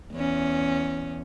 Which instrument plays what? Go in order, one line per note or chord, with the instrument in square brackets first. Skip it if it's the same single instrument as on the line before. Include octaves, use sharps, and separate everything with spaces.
[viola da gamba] E2 C#4